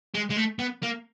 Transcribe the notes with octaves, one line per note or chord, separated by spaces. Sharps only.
G#3
G#3
A3
B3
A#3